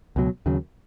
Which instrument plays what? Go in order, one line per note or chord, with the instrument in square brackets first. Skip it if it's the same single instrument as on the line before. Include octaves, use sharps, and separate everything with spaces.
[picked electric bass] C#2 B2 F#3
D#2 C#3 F#3